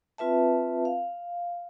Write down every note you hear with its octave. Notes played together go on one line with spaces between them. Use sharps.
C4 F4 B4 E5 A5
F5